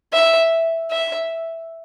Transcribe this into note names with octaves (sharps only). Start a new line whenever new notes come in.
E5
E5